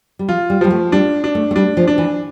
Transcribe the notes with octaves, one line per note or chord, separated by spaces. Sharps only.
G3
F3 F4
G3
F3 G3
A3
G3 D4
D4
A3
A3
G3 D4
F3
D4
E3